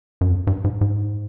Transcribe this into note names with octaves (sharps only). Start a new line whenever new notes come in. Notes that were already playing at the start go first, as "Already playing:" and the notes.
F#2
F2
G2
G#2
G#2